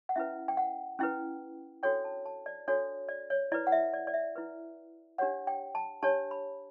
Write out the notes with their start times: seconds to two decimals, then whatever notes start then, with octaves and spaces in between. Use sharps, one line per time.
0.09 F#5
0.16 C#4 E4 B4 E5
0.48 G5
0.57 F#5
0.99 C#4 E4 B4 G5
1.83 D4 F#4 A4 C#5 G5
2.05 A5
2.26 A5
2.46 D5
2.68 D4 F#4 A4 C#5
3.09 D5
3.30 C#5
3.52 E4 B4 D5
3.67 F#5
3.72 E5
3.93 D5
4.07 D5
4.14 E5
4.36 E4 B4
5.18 D4 G4 C#5 F#5
5.47 G5
5.75 A5
6.03 D4 G4 C#5 A5
6.31 B5